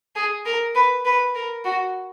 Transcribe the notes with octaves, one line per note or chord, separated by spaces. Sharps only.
G#4
A#4
B4
B4
A#4
F#4